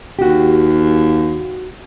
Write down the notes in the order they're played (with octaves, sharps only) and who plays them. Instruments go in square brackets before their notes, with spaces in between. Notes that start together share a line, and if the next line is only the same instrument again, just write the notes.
[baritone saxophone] D#2 [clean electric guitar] F#4 G4